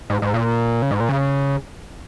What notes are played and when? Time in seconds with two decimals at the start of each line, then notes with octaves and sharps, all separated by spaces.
0.10 G#2
0.22 G#2
0.34 A#2
0.82 C#3
0.91 G#2
1.00 A#2
1.09 C#3